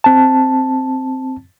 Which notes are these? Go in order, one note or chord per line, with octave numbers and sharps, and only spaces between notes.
C4 A5